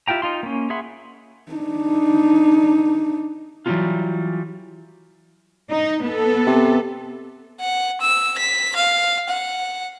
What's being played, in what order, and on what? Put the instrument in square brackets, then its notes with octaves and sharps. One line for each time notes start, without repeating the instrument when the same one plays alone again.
[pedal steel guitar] E4 F4 G4 G5 A#5
D#4 F4 C6
A#3 C#4
G#4 E5 F#5 B5 C6
[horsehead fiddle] D4 D#4
[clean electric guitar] E3 F#3 G3 C#4 D#4 F4
[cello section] D#4
B3 A4
[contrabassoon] C3
[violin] F#5
E6
B6
F5
F#5